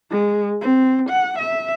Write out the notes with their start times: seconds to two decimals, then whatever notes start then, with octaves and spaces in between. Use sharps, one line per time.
0.11 G#3
0.62 C4
1.10 F#5
1.39 E5